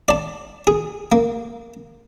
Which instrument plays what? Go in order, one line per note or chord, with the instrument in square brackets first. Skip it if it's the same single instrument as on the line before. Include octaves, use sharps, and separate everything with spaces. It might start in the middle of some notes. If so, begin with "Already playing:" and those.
[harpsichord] D5 A5
G#4
A#3